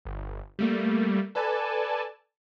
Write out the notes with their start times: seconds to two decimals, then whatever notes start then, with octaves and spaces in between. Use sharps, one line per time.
0.05 G1
0.59 G3 A3 A#3
1.35 A4 B4 D5 G#5 A5